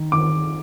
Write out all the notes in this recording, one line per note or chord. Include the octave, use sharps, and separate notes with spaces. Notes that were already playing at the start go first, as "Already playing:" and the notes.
Already playing: D#3
D#3 D6